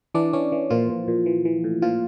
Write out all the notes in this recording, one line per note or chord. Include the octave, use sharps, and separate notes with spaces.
E3 D4 D5
E3 C#4 C#5
E3
A#2 F3 F4
A#2
A#2
E3
E3
A2
A#2 F3 F4